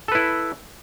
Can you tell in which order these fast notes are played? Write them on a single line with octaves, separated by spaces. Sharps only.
A4 B4 E4